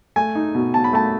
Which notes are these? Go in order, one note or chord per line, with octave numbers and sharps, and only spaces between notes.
A3 G#5
D#4
B2
B2 A5
B5
A3 A5